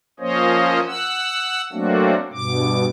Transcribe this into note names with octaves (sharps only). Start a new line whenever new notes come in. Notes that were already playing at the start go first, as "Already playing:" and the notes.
F3 A#3 C#4 C5 C#5 D#5
F#5 E6
F#3 A3 A#3 C4 D4 F#4
G2 B2 D6